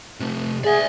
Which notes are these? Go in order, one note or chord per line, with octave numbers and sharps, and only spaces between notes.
C3 A3
G#4 D5 E5